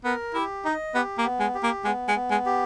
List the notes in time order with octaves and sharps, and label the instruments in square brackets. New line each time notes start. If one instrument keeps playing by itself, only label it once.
[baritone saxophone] B3 [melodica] A#4
[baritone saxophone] E4 [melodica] G4
[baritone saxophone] D#4 [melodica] D#5
[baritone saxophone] B3 [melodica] G4
[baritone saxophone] A#3
[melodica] B3
[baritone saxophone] G#3
[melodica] G4
[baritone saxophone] A#3
[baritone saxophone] G#3 [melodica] B3
[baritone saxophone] G#3
[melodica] B3
[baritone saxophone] G#3
[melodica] G4